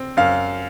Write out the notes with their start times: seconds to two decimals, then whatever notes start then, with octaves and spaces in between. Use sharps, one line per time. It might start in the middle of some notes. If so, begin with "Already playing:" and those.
Already playing: C4
0.17 F#2 F5